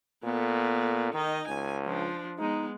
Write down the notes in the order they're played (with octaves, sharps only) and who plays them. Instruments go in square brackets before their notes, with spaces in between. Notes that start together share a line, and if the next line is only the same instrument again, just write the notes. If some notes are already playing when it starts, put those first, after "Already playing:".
[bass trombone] A#2 [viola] B3 A4
[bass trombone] D#3 [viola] D#4 D#5
[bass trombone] C#2 [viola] G#5
[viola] F3 D4
[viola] G#3 B3 [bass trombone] D#4